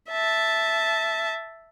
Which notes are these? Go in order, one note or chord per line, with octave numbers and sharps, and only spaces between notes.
E5 A5